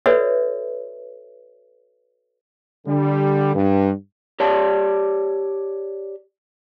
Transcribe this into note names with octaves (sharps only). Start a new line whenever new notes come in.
F#4 A4 B4 C#5 D5 E5
D3 G3
G2
G4 C#5 D5 A5